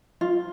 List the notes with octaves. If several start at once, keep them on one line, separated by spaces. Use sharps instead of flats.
F4